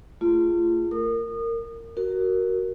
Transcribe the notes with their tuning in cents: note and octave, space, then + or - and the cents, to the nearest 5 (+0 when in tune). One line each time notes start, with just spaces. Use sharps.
A3 +35 F4 -25 G#4 +0
A#4 -20 D#6 -35
F#4 +15 A#4 +0